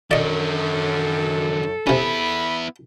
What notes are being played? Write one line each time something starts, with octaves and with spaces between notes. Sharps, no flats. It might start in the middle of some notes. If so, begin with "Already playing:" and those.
F#2 D3 D#3 A4 D5 D#5
C3 B3 C#4 E4 B5